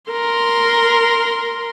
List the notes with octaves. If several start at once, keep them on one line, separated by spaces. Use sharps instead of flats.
A#4 C6